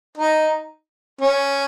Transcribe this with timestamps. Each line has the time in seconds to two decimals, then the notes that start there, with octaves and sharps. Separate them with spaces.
0.17 D#4
1.21 C#4